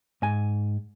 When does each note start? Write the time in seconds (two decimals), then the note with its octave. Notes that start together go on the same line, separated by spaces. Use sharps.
0.22 G#2 G#5